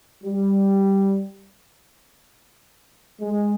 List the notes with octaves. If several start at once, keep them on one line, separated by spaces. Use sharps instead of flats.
G3
G#3